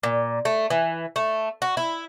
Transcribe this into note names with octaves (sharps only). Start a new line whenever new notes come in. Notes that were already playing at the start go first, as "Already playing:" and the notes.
A#2
A3
E3
A3
F#4
E4